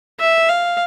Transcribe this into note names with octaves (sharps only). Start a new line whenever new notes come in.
E5
F5